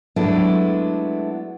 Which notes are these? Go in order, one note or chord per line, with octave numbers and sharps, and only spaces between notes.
F#3 G#3 A3 B3 D4 E4